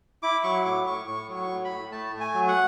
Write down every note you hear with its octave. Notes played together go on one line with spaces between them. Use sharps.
E4 D6
F#3 C#6
A2 D6
A2 C#6
A2 C#6
F#3
C#6
A2
B5
A2
A3 A5
A3
G#5
F#3
F#5